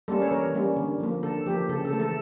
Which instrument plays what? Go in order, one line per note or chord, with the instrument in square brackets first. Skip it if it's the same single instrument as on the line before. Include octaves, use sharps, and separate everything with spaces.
[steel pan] G3 A#3 C#4 A4
C#5
E3 A#4
G3 A#3 C#4
D3
F3 A#3
D3 A4
F3 A#3 G4
C#3 A4
A4
E3 A3
A4